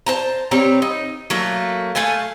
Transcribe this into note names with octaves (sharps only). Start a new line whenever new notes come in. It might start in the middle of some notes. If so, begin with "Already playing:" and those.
C5 A5 A#5
G3 C4 C#5 A#5
D#4
F#3 A3 A#3
A3 F5 G#5 A5